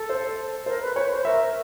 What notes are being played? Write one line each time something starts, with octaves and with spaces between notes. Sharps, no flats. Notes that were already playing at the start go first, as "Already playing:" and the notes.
Already playing: A4
C5
A#4 C5
B4
C5 C#5
C5
A#4 E5